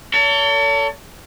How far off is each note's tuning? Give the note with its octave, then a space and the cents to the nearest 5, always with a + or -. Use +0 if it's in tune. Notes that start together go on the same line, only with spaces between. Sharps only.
A4 +30 C#5 +40